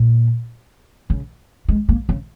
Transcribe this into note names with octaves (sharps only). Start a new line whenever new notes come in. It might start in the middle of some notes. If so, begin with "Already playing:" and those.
Already playing: A#2
C#3
G#3
A#3
C#3